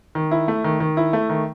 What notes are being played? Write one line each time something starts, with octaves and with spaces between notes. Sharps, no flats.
D#3
E4
A3
D#3
D#3
E4
A3
D#3